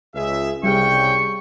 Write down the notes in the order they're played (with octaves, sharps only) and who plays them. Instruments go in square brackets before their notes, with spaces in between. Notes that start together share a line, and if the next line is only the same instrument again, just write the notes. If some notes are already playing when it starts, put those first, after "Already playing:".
[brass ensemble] C#2 G#4 E5
[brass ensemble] C2 C#3 G5 [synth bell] G3 G4 G#4 [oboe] C#6